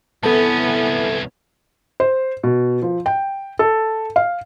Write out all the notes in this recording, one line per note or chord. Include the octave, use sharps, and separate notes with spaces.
C2 E3 B3 C#4 A4 A5
C5
B2
F3
G5
A4
F5